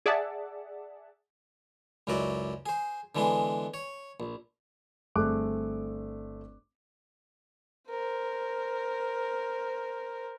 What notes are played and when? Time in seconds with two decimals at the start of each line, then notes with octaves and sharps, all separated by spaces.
0.06 G#4 D5 E5 F#5 A5
2.07 C#2 F#2 F#3 E4 D5 D#5
2.66 G#4 C5
3.15 D3 E3 G#3 B3 G#4
3.74 C#5
4.20 A#1
5.16 G1 A3 C4 G#4 D6 F#6
7.90 A#4 C5